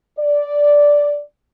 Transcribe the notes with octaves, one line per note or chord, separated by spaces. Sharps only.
D5